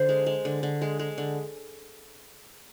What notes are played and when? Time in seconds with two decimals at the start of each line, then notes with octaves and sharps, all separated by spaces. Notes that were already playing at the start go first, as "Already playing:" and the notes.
Already playing: D3 C5
0.09 G#3
0.26 G#3
0.45 D3
0.63 D3
0.81 G#3
0.99 G#3
1.18 D3